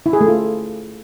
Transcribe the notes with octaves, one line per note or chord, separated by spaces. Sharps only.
E4
G#4
A3
F4